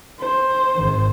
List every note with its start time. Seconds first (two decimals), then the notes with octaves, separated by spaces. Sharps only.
0.20 C5
0.75 G#1 D#3